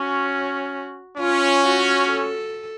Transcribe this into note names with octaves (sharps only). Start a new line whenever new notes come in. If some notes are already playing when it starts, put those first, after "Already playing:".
Already playing: C#4 F#4
C#4 F4
F#4
A4